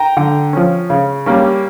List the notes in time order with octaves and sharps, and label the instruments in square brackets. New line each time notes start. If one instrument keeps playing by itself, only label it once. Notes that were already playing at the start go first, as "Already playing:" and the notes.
Already playing: [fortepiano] G5 A#5
D3
F3 C#4
C#3
G3 A#3 C#4